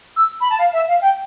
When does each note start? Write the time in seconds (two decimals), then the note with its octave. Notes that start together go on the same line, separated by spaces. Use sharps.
0.16 E6
0.40 B5
0.49 A5
0.58 F5
0.72 E5
0.88 F5
1.01 G5